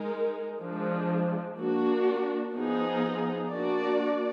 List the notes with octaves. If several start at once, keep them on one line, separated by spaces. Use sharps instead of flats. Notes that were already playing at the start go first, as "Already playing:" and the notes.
Already playing: G#3 D#4 A#4
F3 G#3 D4
A#3 D4 F#4
F3 B3 D#4 G#4
A#3 D4 F#4 D5